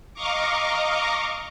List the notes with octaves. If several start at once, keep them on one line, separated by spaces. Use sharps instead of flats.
D#5 F5 A#5 C#6 D6